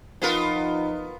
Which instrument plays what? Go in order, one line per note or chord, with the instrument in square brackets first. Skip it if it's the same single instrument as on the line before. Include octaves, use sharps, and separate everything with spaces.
[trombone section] F3 D#4 [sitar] B3 F4 A#4